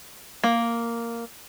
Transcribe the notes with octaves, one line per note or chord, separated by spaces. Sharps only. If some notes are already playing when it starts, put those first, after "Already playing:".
A#3